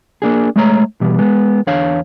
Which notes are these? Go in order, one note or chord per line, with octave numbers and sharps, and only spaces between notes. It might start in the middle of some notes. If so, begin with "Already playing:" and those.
A#3 D4 G#4
G#3 A3 C#5 A#5
B2 E3 G3
G#3 B3
E2 D4 C#5 F5